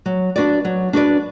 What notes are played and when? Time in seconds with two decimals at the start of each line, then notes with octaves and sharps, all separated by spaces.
0.06 F#3
0.36 D4 F#4 B4 D5
0.65 F#3
0.93 D4 F#4 B4 D5